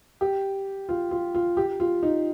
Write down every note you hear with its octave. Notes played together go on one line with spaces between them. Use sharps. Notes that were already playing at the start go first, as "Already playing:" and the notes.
G4
F4
F4
F4
G4
F4
D#4